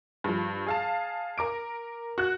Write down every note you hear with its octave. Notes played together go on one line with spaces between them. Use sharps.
G2 F3
G#4 F5 A5
A#4 D6 D7
F#4 F#6